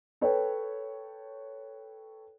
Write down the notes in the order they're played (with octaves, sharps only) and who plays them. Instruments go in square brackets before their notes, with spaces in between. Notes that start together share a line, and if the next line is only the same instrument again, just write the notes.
[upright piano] A4 B4 C#5 G5